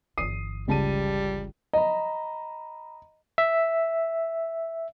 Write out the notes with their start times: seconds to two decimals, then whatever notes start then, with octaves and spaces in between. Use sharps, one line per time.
0.18 G1 E3 D#6 C7 D#7
0.68 C#2 G3 A5 D#7
1.73 D#5 A#5 B5
3.38 E5